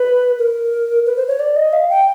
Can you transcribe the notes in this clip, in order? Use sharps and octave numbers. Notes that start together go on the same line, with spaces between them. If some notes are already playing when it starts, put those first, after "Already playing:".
Already playing: B4
A#4
B4
C5
C#5
D5
D#5
F5
G5